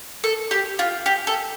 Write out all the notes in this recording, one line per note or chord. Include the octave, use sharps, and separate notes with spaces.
A4
G4
F4
G4
A4